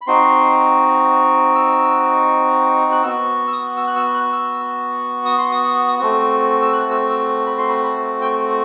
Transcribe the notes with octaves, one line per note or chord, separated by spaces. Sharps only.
B5
C4 D#4 F#4 C6
E6
F#6
B3 F#4 E6
E6
D#6
E6
F#6
E6
F#6
E6
D#6
C6
D#6
A3 C4 F#4
E6
F#6
E6
E6
B5
C6
B5
B5
G5